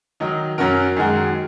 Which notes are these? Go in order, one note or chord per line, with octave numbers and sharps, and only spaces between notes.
D#3 F#3 D#4
F#2 F#3 C#4 F#4 A#4
F#2 D#3 G#3 F#4